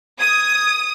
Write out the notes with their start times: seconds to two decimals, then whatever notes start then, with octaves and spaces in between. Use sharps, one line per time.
0.20 D#6 G#6